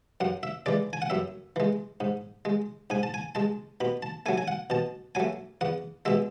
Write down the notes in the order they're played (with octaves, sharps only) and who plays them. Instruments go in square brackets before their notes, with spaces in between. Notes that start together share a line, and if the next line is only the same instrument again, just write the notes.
[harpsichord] F#2 F#5
E5
E3 G#3 D5
G#5
F#5
F#2 E5
E3 G#3
G#2
G#3
G#2 G#5
A5
G#5
G#3 A5
B2 B5
A5
F#3 A3 G#5
G#5
F#5
B2 A5
F#3 A3 G#5
E2 F#5
B2 G#3 E5